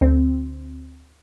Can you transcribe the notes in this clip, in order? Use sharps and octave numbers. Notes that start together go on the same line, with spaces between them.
D2 C4